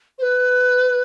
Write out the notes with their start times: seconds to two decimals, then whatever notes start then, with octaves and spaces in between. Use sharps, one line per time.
0.18 C5
0.22 B4